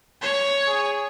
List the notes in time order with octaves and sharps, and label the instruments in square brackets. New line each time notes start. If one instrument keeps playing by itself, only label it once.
[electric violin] C#5
[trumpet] G#4